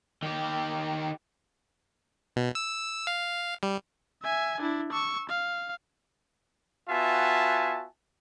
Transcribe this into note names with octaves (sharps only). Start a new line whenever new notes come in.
D#3 G4
B2
E6
F5
G3
E5 G#5
D4 E4
C#6 E6
F5
B3 F4 F#4 E5 G#5 A5